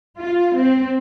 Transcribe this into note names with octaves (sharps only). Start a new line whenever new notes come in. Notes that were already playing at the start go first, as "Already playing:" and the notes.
F4
C4